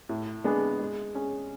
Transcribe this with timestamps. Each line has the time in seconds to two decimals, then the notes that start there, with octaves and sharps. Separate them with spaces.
0.09 A2
0.44 G#3 B3 D4 G#4
0.79 G#3
1.15 C#4 G#4